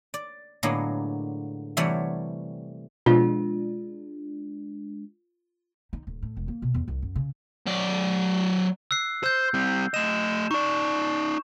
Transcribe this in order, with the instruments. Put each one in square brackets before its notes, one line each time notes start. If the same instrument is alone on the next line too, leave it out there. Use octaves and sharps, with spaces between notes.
[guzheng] D5
A2 D3 F#3 G#3 A#3 B3
C3 E3 G3 A3 C#5 F#5
[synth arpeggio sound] B2 F3 [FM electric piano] G#3 D4 [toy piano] F4
[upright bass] D#4
D1
A2
E1
A#3
B2
E2
C2
F#2
C#3
[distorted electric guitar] F#3 D5
[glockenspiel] E6 F#6 C7
[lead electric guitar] C5 [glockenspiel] E6 G6
[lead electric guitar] G3 C4
[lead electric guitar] A3 D#5 [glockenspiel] E7
[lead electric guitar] D#4 D5 [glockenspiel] C#6